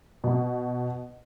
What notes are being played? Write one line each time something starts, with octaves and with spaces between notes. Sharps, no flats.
B2